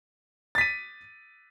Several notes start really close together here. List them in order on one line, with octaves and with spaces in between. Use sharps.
A6 B6 D#7